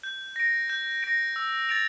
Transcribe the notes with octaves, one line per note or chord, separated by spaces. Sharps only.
G6
A#6 D7
G6
A#6 D7
E6
A6 D7 F7